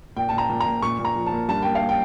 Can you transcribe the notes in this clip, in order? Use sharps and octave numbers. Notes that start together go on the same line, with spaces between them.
A#2 G5
A#2 A5
A#5
A#2
A#5
A#2
A#2 C#6
A#2
A#5
F3
A5
A#3
G2 A5
A#3 G5
F5
A#3
G5